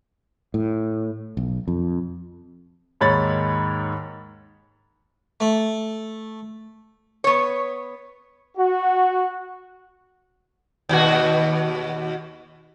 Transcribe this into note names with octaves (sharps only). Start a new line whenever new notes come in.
A2
B1
F2
D#2 G#2 C#5 B5 A6
A3
B3 C#5
F#4
D#2 B2 F#4